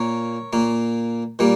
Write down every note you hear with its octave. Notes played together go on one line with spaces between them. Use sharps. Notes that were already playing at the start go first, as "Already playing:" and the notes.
Already playing: A#2 A#3 A#4 C#5
A#2 A#3
A#2 G3 A#3